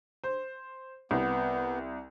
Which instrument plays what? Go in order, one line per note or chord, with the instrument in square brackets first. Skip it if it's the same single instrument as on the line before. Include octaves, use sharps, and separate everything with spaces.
[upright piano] C5
[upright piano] C2 [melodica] B3